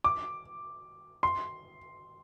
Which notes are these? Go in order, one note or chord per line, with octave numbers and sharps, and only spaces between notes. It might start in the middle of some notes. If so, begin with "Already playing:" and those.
D6
C6